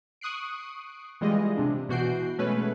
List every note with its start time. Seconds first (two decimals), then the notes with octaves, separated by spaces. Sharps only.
0.21 C#6 D#6 F#6 C7 D7
1.21 E3 G3 G#3 F4 D#5
1.57 C3 D4
1.89 B2 E3 F#4 G6 C7 D7
2.38 B2 G#3 A3 C#4 B4